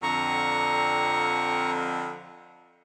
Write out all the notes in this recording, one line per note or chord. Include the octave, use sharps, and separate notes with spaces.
F2 D3 A#5 C#6